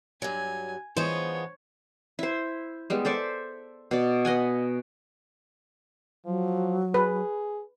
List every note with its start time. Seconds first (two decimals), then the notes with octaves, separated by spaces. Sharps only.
0.22 G2 F#3 G#5
0.97 E3 F3 G#3 B3 C5 C#5
2.19 E4 C5
2.90 G3 G#3 B3
3.05 A4 C5 D5 E5
3.91 B2 D5
4.25 B4 D#5 F#5 G#5
6.26 F3 F#3
6.94 G#4 B4